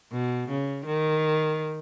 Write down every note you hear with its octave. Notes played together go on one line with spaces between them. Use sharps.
B2
C#3
D#3